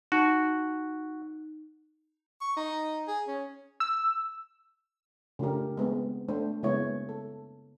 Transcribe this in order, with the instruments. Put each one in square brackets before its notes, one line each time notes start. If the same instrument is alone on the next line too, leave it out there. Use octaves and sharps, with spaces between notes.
[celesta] D#4 [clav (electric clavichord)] F#4
[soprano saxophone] C#6
D#4
G#4
C#4
[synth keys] E6
[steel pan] C#3 A3 D4 F4 G4 A#4
G#3 B3 C4
A3 D4 C5
C#3 G#3 A#3 B3 E4 C#5
A4